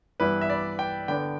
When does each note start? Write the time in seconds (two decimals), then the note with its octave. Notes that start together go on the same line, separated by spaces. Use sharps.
0.20 G2 E3 G3 B3 E4 B4
0.41 E5
0.50 D5
0.79 G5
1.08 D3 B3 D4 G5